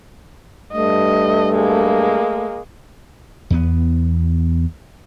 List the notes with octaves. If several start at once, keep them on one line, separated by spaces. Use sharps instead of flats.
G2 A3 D#5
G#3 A#3
E2 B3